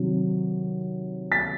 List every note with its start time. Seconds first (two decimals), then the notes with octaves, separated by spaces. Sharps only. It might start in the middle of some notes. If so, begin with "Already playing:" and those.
Already playing: C3 D#3 F#3
1.32 A6 B6